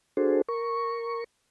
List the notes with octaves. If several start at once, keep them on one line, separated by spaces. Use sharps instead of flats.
D4 F#4 G#4 A4 C5
A#4 C#6